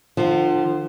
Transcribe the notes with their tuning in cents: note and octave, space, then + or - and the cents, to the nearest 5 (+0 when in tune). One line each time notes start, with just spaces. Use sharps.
D3 +40 F3 +0